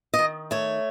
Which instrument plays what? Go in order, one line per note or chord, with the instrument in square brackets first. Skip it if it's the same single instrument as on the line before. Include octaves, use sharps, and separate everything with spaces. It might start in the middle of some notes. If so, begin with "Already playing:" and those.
[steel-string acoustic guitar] D#5
D#3
A3 C#5